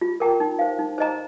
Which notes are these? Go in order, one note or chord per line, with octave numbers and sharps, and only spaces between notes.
F4
A#4 G5 A#5
D#4
C5 F5
D#4
C5 D#5 A#5